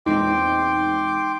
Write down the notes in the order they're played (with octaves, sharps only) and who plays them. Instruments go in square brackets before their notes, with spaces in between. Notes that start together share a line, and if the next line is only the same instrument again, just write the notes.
[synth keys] E2 A#2 C4 [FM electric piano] G#3 D#4 [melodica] G5 C6 D6